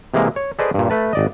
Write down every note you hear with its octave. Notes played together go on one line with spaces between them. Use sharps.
C3 E3 G#3 A#3
C#5
G#4 A4 B4 C5 D5 D#5
G2 A#2
A3 B4 A5
G#1 D5 D#5